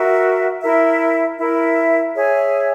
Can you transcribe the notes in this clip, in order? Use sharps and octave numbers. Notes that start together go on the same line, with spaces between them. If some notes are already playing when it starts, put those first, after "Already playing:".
Already playing: F#4 A#4 E5
E4 A#4 E5
E4 A#4 E5
G#4 C#5 E5 G#5